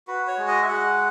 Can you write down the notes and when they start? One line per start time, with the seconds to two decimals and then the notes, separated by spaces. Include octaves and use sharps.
0.07 F#4 B4
0.28 C#5
0.38 G#3
0.48 D#5
0.62 E5
0.68 G#3 F#5